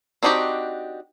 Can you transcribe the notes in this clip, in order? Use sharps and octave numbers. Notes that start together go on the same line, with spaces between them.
C4 D4 D#4 F#4 G4